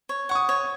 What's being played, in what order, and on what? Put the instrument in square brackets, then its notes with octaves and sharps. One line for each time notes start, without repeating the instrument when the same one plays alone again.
[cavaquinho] C#5
[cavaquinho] F#5 [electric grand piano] C#6
[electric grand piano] D#6
[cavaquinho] C#5